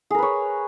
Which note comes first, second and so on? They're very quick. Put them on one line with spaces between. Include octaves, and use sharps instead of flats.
G#4 A#4 B4 C#5